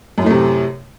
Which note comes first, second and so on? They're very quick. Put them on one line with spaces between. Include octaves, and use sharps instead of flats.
F#2 A2 A3 C3